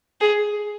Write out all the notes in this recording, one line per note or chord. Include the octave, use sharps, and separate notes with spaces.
G#4